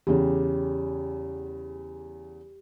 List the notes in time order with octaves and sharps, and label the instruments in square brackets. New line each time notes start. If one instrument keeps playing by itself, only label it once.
[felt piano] E2 C#3 [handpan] G4